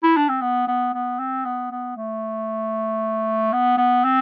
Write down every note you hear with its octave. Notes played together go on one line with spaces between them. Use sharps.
E4
D4
C4
B3
B3
B3
C4
B3
B3
A3
B3
B3
C4